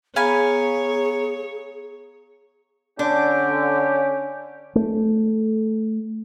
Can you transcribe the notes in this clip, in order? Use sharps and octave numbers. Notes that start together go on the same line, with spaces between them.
B3 G#4 C#5 F5 G#5 A#5 B5
D3 C#4 D4 G4
A3